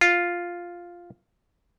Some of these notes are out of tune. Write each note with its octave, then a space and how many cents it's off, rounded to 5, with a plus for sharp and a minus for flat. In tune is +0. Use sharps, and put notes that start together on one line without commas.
F4 +0